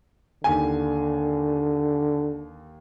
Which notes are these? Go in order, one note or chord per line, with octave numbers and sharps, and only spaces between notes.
D#2 D3 G#5